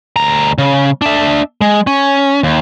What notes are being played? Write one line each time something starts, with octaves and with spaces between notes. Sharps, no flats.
D2 A#5
C#3
D4 E5
G#3
C#4
D#2